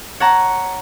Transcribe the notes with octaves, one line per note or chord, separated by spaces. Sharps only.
C#5 F#5 A5 A#5